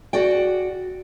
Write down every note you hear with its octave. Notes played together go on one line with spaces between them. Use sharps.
F#4 G#4 D5 G5